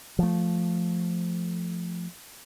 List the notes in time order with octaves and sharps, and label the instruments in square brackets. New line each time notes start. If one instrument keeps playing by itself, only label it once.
[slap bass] F3 A3